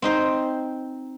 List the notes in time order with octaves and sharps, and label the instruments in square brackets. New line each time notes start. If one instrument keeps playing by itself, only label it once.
[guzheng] C4 D#4 C5